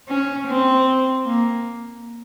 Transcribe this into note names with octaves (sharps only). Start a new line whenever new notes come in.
C#4
C4
A#3